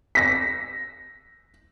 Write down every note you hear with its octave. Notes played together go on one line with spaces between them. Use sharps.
A#6 B6